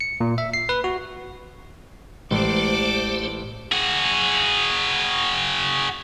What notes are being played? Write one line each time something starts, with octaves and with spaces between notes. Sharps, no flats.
C#7
A#2
E5
C7
B4
F#4
A1 G#3 A3 G4 C5 D5 D6 C7
F#4 G#4